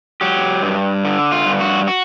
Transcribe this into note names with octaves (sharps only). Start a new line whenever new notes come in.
F#3 G4
G2
D3
F4
G2
F#4
F#4